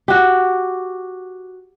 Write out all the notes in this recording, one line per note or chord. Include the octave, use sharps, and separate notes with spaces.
F#4 G4